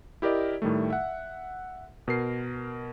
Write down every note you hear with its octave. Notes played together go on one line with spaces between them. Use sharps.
E4 G4 A#4 D5 D#5
A2 D#3 G3 A3
E5 F#5
B2 A#4 C7